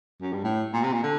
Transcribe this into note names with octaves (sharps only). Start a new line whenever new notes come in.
F#2
G2
A2
A#2
C3
A#2
D3